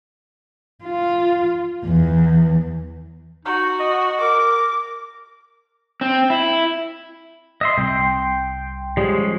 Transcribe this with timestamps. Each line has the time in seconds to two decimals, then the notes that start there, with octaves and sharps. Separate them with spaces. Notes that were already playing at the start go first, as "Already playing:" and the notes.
0.84 F4
1.85 E2
3.45 D#4 F#4
3.80 D#5
4.21 A#4 D6
6.01 C4
6.30 E4
7.61 D#5 E5 C6
7.78 C2 G5 C6
8.97 F3 G3 G#3 C#4